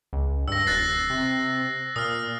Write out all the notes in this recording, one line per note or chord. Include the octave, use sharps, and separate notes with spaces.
C#2
G2 E6 A#6
D#1 F#6 A6 C7
C3
A#2 D#6 F6